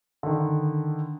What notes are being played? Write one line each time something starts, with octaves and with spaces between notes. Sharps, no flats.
D3 D#3